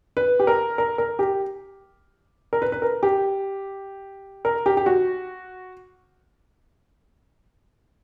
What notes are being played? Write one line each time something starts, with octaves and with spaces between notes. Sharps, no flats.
B4
G4
A#4
A#4
A#4
G4
A#4
B4
B4
A#4
G4
A#4
G4
G4
F#4